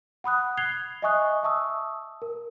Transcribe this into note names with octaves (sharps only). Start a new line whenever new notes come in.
F#5 B5 D#6 F#6
F#6 G#6 C7 F7 G7
D#5 E5 G#5 C#6 D#6 F#6
E5 A5 C#6 D#6 E6
A#4